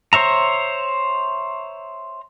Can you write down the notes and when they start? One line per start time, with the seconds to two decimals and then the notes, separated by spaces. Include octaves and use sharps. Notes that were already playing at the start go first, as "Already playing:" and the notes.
0.13 C5 C#5 E5 A#5